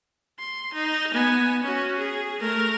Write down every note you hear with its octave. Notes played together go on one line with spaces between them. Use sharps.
C6
D#4
B3 G#5
C#4 F#4
G#4
A3 A#4